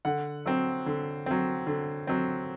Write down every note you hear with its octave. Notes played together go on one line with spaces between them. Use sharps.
D3 F#5
F#3 C4
D3
F#3 C4
D3
F#3 C4